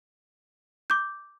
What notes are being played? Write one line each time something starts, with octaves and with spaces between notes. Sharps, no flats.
D6 G6